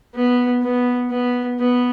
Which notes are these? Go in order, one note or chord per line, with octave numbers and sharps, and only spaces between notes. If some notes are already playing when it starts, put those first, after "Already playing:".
B3
B3
B3
B3